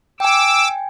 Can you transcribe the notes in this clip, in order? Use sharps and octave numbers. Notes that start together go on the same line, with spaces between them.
G5 G#5 D6 E6